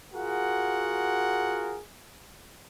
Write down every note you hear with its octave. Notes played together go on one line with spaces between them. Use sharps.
F4 F#4 G#4 A#4 F#5